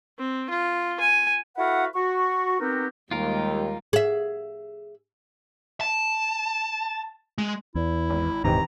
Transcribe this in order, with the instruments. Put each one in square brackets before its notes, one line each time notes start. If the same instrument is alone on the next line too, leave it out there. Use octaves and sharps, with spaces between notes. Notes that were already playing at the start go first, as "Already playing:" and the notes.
[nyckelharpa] C4
F4
G#5
[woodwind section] E4 F#4 A4 B4 F5 F#5
F#4 C#6
B3 C4 D#4 F#4 G4 A#4
[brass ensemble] D#2 [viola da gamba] G3 G#3 [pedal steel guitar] F4 A#4
[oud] G#4 E5
[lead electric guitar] A5
G#3
[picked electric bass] E2 [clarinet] E4
[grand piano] G#1
[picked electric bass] D#1 G#2 [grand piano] C3 D#3 E3 [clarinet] A#5